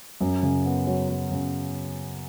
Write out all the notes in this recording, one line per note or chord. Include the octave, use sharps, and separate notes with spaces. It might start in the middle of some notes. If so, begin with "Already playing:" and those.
F#2
C#3
B3
F#3
F#3
C#3